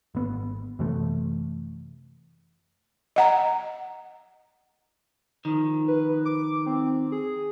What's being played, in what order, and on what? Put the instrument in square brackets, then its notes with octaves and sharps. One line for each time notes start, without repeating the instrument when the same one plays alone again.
[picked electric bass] G#1 B3
F#2 C3 E3 A3
[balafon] D#5 F#5 A#5
[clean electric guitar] D#3 F3
[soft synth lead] B4
D6
C4
G#4